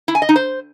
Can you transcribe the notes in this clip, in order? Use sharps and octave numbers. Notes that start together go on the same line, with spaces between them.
E4
G#5
D#5
D#4
C5